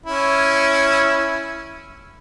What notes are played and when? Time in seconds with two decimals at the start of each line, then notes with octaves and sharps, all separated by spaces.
0.06 C#4 E4